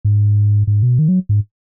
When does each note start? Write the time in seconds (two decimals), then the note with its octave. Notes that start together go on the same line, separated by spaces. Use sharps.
0.05 G#2
0.67 G#2
0.83 B2
0.99 D#3
1.08 F#3
1.29 G#2